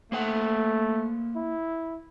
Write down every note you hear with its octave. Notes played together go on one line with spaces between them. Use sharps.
A3 A#3 C5 F#5
E4